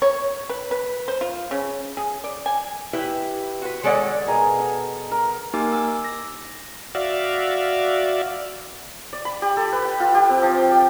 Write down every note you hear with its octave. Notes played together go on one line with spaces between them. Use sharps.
C#5
B4
B4
C5
F4
C#3
G#4
D5
G#5
E4 G4 B4 E5
F#4 B4
D#3 G#3 A4 C#5 D5 F#5
B2 G#4 A#4 G#5
A4
A#4
A#3 D#4 G4 A#4 G#5 D6
G#5 D6 E6
A#6
F#4 D5 E5 F5
D5
B5
G4
A4
B4
G5
F4
G4
C4
F3
G5
G4